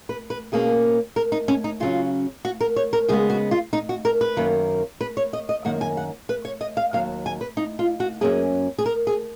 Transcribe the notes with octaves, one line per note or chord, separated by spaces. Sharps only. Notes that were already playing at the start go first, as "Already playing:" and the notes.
B4
B4
B2 A#3 C#4 G#4
A#4
D#4
C#4
D#4
C#3 F#3 C#4 F4
F#4
A#4
C#5
A#4
C#3 G#3 B3 G#4
F#4
F4
D#4
F#4
A#4
B4
F#2 D#3 A#3
B4
C#5
D#5
D#5
F#2 D#3 A#3 F#5
G#5
F#5
B4
C#5
D#5
F5
D#2 D#3 F#3 F5
G#5
B4
D#4
F4
F#4
F#2 D#3 A#3 C#4 G#4
G#4
A#4
G#4